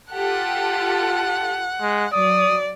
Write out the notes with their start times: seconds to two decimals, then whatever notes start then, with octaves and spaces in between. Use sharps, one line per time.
0.13 F4 G4 A4 F#5
1.81 G#3
2.13 F#3 D5 D#6